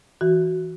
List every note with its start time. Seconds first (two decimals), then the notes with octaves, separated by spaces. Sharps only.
0.21 E3 F#4